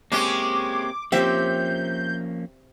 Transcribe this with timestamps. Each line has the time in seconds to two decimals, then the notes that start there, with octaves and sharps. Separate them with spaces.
0.12 G#3 A#3 C4 C#4 G4 D6
1.12 F3 A#3 C4 C#4 G4 E5 G6